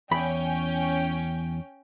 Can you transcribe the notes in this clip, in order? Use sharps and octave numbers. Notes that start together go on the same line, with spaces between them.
E2 C#4 G5 B5